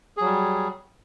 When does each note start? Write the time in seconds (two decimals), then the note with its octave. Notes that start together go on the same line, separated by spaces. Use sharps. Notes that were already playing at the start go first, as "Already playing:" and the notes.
0.17 G#4
0.21 F#3
0.25 G3